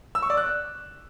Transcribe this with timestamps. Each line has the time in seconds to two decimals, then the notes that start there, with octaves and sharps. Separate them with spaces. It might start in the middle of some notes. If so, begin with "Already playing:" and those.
0.15 E6
0.22 C#6
0.30 D5
0.37 F#6